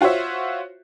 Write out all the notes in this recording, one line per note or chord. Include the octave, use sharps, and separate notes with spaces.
F4 F#4 C5 C#5 E5